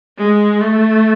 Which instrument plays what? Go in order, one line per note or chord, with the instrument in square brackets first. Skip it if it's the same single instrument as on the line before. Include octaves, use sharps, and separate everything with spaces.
[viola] G#3
A3